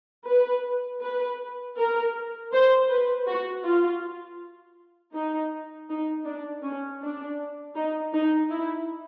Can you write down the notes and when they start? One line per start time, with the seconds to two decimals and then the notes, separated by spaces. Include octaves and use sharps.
0.28 B4
1.02 B4
1.77 A#4
2.53 C5
2.90 B4
3.27 F#4
3.64 F4
5.14 D#4
5.89 D#4
6.26 D4
6.63 C#4
7.01 D4
7.75 D#4
8.13 D#4
8.50 E4